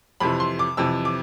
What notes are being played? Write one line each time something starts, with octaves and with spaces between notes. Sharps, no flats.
F2 C3 E3 B5
C6
D6
F2 C3 E3 E6
D6